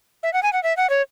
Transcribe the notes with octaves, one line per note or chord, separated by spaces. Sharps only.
E5
F#5
G#5
F#5
E5
F#5
C#5